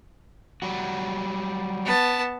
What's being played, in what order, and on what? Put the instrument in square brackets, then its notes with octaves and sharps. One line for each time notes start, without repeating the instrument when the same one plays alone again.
[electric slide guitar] F#3 G3 F#4
[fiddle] B3 A5